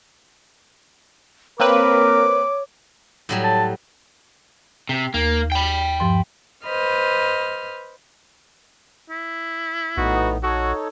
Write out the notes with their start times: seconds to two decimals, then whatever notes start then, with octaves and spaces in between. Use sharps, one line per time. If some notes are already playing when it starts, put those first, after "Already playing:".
1.60 A#3 C4 A#4 B4 C#5 D6
3.29 A2 F#3 G3
3.44 A5
4.89 C3
5.14 D#2 A#3
5.52 G5 B5
6.00 G2 F3 C6
6.64 B4 C5 D#5 F6
9.10 E4
9.97 A#1 A2 B3 D#4 F#4
10.43 D#4 F#4 A4 C#5